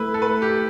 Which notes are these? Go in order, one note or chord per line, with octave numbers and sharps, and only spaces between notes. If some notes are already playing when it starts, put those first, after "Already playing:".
Already playing: A3 E4 B4
A4
B4
G4